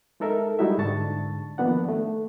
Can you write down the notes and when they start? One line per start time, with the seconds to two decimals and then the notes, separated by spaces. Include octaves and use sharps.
0.20 G#3 D#4 A4 A#4 E5
0.59 G3 G#3 D#4 E4 F#4 E5
0.78 G#2 D3 D4 A5 C#6 A6
1.58 D#3 F3 A#3 B3 D4 F#5
1.89 A3